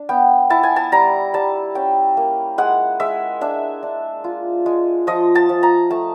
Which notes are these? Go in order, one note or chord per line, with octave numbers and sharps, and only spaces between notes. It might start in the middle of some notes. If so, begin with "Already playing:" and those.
Already playing: D4
B3 G5
E4 A5
G#5
A5
G3 A#5
G3 A5
C#4 G5
A#3
G#3 F#5
G#3 E5
D4 E5
D4
F4
G#3
F3 D#5
A5
F3
A#5
A3 A5